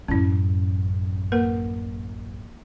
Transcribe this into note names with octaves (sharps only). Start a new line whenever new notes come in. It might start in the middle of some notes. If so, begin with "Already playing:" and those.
A1 F#2 C#4 E4
A#3 A#4 B4